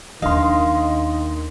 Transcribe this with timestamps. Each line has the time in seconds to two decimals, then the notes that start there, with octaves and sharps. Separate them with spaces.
0.22 D#2 D#3 D4 D#5 F5 C6